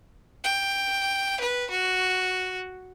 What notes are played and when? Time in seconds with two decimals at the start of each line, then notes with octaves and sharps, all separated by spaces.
0.44 G5
1.40 B4
1.70 F#4